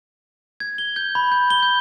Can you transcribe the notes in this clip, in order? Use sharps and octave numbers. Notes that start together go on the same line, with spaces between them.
G#6
G7
G6
B5
G6
G7
G6